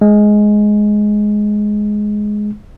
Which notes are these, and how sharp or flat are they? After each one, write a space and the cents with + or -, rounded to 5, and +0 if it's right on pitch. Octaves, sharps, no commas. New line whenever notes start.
G#3 +10